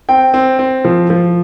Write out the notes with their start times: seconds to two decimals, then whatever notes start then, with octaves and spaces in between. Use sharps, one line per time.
0.09 C4 G5
0.34 C4
0.59 C4
0.85 F3
1.10 F3